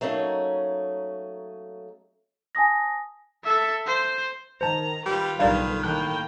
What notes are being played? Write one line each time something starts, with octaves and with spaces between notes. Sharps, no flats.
F#3 A3 A#3 C#4 D#4
G#5 A5 D#6 A#6
A4 E5
C5
D#3 C5 A5 A#5
G3 F4 B4
B1 D3 D#3 G3 A#4 D5 F5
A2 D#3 A#3 G5 F#6